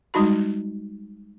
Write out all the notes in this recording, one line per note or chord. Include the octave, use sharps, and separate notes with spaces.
G3 G#3 D#4 F#4 B5